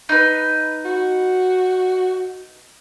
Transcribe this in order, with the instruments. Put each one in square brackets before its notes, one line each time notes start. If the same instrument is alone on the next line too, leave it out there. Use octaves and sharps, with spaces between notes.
[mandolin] D#4 B4
[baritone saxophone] F#4